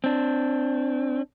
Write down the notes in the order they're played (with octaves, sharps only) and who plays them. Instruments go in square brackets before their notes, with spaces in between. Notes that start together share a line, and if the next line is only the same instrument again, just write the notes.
[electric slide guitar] C4 D4